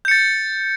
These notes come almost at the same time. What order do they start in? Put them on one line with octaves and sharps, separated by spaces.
G6 C#7 A6